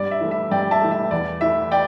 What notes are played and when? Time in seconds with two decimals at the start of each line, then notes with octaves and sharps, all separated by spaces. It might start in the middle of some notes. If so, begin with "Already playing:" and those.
Already playing: G2 D5
0.11 E5
0.21 E3 A3
0.31 E5
0.51 G2 D5 G5
0.71 E5 A5
0.82 E3 A3
0.91 E5
1.11 E2 D5
1.41 E3 A3 E5
1.71 D5 G5